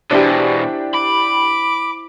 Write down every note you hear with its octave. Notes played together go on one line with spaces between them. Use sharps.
E2 B2 D4 E4 G4 C5
B5 D6